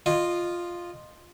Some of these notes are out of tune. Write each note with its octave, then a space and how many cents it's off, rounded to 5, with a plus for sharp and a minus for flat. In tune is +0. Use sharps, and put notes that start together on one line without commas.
F4 +0 D#5 -20